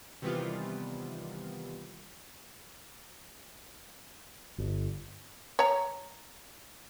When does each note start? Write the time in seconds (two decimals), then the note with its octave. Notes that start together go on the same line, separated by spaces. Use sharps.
0.22 C3 D#3 E3 G3 B3 F4
4.58 G1
5.59 C#5 A#5